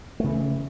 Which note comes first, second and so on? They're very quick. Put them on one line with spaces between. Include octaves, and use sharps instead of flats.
A3 C#3 E3